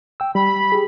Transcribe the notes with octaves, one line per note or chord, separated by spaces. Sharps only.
G5 E6
G3 B5
G4 G#4